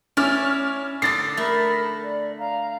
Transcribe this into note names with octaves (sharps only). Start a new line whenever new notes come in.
C#4 E4 D5 F6
D3 D4 D6 D#6 A6 C7
A3 A#4 B5
D5
F5 A#5